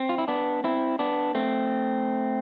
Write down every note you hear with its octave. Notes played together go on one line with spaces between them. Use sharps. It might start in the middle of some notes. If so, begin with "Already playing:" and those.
Already playing: C4
F4
E4
B3 D4
C4 E4
B3 D4
A3 C4